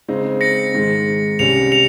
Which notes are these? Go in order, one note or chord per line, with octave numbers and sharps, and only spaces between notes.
C#3 G#3 C4 D#4
A#6 C#7
G#2 D#3 G#3
C2 C3 G3 C#4 C#7 F7
C#7 F7